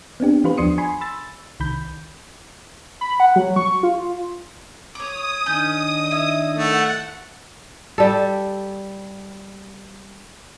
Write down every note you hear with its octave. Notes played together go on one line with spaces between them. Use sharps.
B3 C4 D4 G4
E3 B3 F4 G4 B4 C5
D#2 F3 D4 C6 D#6 C#7
G#5 B5 C6
B5 E6 A6
C2 D#3 B5 G6
B5
F#5
F#3
C#6
F4
C#5 D6 D#6
D#3 C#4 D4 D#5 G6
E4
A3 F#5
G3 A4